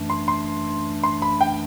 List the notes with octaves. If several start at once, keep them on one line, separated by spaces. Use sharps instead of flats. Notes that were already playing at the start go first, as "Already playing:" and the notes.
Already playing: F#2 E3 A3 D4
C6
C6
C6
B5
G5